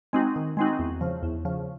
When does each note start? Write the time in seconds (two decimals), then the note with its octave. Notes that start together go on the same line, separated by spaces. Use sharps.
0.13 G#3 C4 D#4 F#4
0.36 D#3
0.57 G#3 C4 D#4 F#4
0.79 E2
1.01 C#3 F3
1.23 E2
1.45 C#3 F3